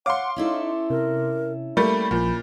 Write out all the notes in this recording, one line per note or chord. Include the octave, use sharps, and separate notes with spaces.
C#5 F5 F#5 C6 D6
C#4 D#4 E4 A4
C3 A#4
G3 A3 A#3 B5
A#1 A#2 F3 G6